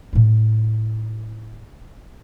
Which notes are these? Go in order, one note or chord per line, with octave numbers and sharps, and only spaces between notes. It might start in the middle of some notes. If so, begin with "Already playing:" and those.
A2 C4